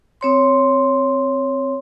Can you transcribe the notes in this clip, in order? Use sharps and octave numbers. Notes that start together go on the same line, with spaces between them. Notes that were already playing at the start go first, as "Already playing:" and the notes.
C4 C#5 C6